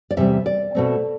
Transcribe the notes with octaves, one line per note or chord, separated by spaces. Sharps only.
D5
E2 C3 G3 E5
D5
B2 A3 C4